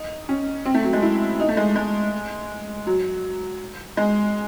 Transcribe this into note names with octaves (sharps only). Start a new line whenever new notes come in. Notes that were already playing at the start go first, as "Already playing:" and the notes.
Already playing: D#4
C#4
C4
A3
F#3
G#3
E4
D#4
A3
G#3
G#3
F#3
G#3